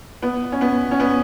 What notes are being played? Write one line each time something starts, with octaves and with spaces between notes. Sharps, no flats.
B3
C#4
B3
C#4
B3